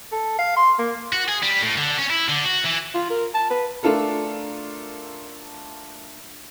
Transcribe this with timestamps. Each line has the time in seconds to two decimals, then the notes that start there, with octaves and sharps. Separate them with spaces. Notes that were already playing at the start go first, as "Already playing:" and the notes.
0.12 A4
0.39 F5
0.56 C6
0.79 A#3
1.13 F#4
1.29 G#4
1.43 G3
1.61 A2
1.77 D3
1.98 C#4
2.10 E4
2.29 D3
2.45 F#4
2.64 E3
2.94 F4
3.10 A#4
3.35 A5
3.50 B4
3.83 A3 D4 F4 A4 A#4